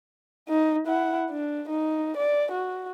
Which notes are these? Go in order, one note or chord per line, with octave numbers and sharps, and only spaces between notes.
D#4
E4 F#5
D4
D#4
D5
F#4